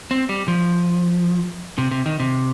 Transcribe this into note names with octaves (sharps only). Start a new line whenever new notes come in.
C4
G3
F3
C3
C3
D#3
C3